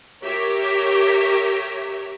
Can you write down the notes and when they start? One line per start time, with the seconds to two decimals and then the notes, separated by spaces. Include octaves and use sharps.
0.23 G4 A#4 C#5 E5